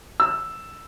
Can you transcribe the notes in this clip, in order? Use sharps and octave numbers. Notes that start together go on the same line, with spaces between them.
E6